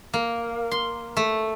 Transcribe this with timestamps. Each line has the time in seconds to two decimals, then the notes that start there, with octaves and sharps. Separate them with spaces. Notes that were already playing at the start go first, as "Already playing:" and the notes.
0.14 A#3
0.71 C6
1.17 A3